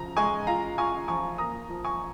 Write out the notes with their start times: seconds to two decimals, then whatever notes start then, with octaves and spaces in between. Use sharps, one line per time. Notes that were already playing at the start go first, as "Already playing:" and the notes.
Already playing: C#3 F3 A#5
0.16 G#3 G#5 C#6
0.47 F4 F5 A#5
0.78 F4 G#5 C#6
1.08 F3 G#5 C#6
1.38 A#3 A#5 D#6
1.70 F3
1.85 G#5 C#6